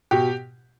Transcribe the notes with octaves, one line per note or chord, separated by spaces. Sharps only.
B2 G4